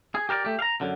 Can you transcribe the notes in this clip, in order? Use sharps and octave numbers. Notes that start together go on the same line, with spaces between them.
G#4
G4 A#4 C5 D5
A3 G4
F5 A#5
F#2 D3